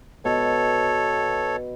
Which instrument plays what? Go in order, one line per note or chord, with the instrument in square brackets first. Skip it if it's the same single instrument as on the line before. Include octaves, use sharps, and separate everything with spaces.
[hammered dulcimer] B2 [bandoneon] A4 C#5